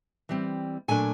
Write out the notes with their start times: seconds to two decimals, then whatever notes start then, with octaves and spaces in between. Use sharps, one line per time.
0.29 E3 G3 C4
0.88 A#2 F#3 A3 D4 G#5